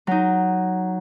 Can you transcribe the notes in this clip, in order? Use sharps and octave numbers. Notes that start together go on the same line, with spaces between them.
F#3 D#4